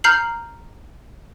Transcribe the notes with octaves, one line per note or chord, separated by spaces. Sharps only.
A#5 F6 G6 C7 F#7